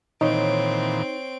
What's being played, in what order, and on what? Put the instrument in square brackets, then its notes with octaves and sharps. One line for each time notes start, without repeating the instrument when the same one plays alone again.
[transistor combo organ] A#2 D#3 E3 [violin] C4 D7 [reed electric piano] D#4 [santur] C#5